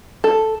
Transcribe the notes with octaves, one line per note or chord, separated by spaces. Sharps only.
A4